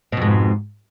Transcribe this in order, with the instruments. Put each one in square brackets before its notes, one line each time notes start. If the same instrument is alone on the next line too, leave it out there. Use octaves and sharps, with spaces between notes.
[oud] B2
F2
G#2